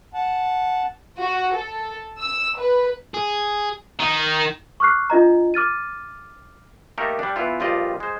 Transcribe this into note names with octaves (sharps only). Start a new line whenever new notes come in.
F#5 A5
F#4
A4
E6
B4
G#4
D#3
C#6 D6 F6 F#6 C7
D4 F4 D#5 A#5
D6 F6 A6 D#7
A3 A#3 D#4 G4 A4 A#4
G3 D4
E3 B3 E4 F4
A#1 G2 F4 G4 D5 D#5
G#3 C5